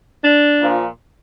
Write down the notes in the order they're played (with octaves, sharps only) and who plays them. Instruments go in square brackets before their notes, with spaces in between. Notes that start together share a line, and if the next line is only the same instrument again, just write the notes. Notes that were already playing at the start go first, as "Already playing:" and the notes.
[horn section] D4
A#2 F3